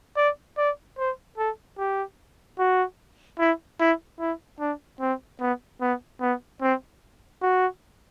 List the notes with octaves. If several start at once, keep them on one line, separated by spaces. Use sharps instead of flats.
D5
D5
C5
A4
G4
F#4
E4
E4
E4
D4
C4
B3
B3
B3
C4
F#4